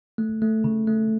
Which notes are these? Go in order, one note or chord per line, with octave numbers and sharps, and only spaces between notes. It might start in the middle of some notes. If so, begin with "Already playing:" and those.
A3
A3
C#3
A3